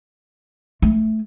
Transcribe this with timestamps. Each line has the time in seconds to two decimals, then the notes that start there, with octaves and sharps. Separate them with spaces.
0.82 A3